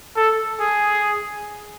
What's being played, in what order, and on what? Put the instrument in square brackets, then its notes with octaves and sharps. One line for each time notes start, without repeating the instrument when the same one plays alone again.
[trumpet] A4
G#4